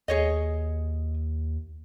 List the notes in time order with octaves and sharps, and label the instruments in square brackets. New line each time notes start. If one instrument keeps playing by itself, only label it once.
[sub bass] D#2 [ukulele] G#4 C#5 D#5